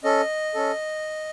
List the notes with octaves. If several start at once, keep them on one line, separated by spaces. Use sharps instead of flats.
C#4 A4 D#5
C#4 A4